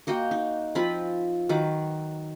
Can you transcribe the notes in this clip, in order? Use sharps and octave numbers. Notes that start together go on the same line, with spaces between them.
A#3 F#4 D#5 G5
D#4
F3 C4 F4 B5
D#3 F#3 B4 D6